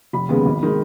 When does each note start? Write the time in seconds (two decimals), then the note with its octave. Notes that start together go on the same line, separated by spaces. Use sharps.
0.13 F1 B5
0.29 D#2 C#3 G#3 B3
0.46 G#1
0.63 D#3 G#3